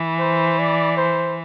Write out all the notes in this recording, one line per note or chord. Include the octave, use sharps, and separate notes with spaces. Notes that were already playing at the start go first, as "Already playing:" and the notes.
Already playing: E3
C5
D5
C5